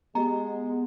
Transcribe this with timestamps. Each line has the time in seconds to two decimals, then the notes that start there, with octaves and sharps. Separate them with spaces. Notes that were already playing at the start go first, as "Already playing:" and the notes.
0.15 G#3 B3 G4 D#5 A#5